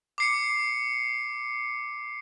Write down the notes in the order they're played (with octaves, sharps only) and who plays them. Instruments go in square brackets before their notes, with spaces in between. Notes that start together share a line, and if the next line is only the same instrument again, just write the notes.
[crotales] D6 C7 C#7